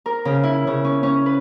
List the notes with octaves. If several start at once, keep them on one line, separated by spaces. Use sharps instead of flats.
A#4
C#3
E4
C#3
C#4
C#4
B4